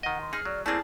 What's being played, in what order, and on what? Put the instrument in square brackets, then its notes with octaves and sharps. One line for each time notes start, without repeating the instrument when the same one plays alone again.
[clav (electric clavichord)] D#3 D#5 [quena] F#5
[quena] C6
[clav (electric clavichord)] D#4 [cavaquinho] G#4 [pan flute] F6
[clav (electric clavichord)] F#3 [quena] D5
[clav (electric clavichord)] A3 A#3 C4 [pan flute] E4 [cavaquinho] G#4 A5 [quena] D5